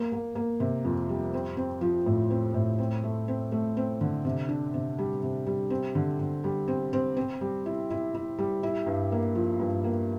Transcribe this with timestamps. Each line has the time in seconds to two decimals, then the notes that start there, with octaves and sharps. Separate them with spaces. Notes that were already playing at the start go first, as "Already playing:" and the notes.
Already playing: A#3
0.12 A#3
0.35 A#3
0.60 C3
0.85 F2
1.09 G3
1.34 C4
1.57 C4
1.81 F3
2.06 A2
2.30 C4
2.54 A2
2.79 C4
3.03 A3
3.28 C4
3.52 A3
3.77 C4
4.01 D3
4.25 C3
4.49 D4
4.74 C3
4.99 G3
5.23 C3
5.47 G3
5.70 C4
5.95 D3
6.19 D3
6.44 G3
6.68 C4
6.93 C4
7.17 C4
7.41 G3
7.66 E4
7.90 E4
8.15 E4
8.38 G3
8.63 E4
8.86 G2
9.12 A#3
9.35 F3
9.60 G2
9.84 A#3